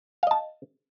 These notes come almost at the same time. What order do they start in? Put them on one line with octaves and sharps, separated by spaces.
F5 D#5 A5